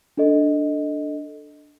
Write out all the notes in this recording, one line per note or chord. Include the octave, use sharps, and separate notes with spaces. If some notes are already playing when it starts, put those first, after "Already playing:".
D4 A4 D#5